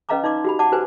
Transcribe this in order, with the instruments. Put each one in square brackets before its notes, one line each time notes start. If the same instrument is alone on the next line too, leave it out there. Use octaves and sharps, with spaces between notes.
[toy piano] C#4 B4 D#5 F5 A#5 D6
D#4 D5 C6 D6
F#4 G4 B5
D5 F#5 A5 D6
F#4 G4 B4 C5 G#5